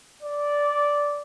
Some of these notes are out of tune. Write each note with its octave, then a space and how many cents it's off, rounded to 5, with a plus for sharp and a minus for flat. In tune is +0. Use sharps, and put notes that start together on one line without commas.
D5 -10